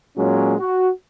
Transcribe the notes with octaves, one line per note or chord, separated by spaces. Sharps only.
A#2 F#3 G#3 C#4
F#4